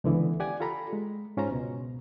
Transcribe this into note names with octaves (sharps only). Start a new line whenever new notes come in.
C#2 D3 E3 B3
G4 D5 F#5 G#5
F4 G4 A4 A#5 B5
G#3
G#2 C#4 F4 C5 A#5
C#2 B2